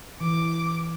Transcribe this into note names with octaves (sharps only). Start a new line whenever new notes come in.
E3 D6